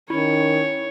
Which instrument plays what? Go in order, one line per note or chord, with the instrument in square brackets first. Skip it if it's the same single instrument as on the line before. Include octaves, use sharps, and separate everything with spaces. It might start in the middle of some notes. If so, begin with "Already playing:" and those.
[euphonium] D#3 [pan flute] C#4 [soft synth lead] E4 [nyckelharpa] C#5